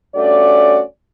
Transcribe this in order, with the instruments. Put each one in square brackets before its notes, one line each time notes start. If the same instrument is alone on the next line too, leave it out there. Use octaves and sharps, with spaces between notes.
[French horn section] G2 A3 C#4 F#4 D5